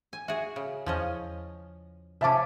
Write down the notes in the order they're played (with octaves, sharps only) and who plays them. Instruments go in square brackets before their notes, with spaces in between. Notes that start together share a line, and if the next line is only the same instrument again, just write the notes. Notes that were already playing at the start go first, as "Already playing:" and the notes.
[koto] G#5
[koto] F#4 G#4 [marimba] E5
[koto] C#3
[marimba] E2 [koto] F3 C#4 D#5
[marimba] C3 [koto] F3 C#4 [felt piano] E5 A5 D6